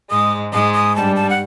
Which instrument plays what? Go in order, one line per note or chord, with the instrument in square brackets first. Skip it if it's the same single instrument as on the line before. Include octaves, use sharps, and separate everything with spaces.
[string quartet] G#2 G#3 [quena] D#6
[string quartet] G#2 G#3 [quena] D#6
[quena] D#6
[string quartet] G2 G3 [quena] A5
[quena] A5
F#5